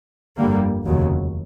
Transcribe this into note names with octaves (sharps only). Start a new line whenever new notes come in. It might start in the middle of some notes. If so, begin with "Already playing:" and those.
G1 F2 D3 G3 A#3
F1 D#2 C#3 F#3